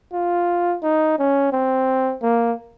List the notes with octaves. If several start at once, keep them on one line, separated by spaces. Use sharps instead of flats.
F4
D#4
C#4
C4
A#3